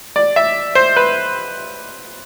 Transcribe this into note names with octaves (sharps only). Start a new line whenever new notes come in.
D5
E5
C5
B4